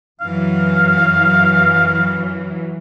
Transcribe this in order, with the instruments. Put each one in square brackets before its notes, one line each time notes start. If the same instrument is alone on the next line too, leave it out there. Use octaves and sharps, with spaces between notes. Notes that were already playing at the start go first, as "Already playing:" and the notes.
[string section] F#2 E3 F#3 [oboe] F5